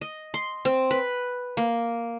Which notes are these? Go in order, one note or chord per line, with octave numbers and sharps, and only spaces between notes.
D#5
C6
C4
B4
A#3